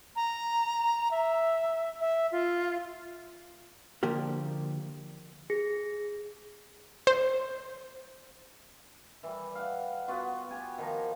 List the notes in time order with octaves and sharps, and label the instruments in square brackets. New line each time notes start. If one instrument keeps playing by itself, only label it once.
[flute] A#5
E5
E5
F4
[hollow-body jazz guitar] D3 F3 A#3 G4 A#4
[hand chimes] G#4 A#6 C#7
[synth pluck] C5
[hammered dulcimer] E3 G3
F5 F#5
B3 F4 F#4
G4 G#5
D#3 F3 A#5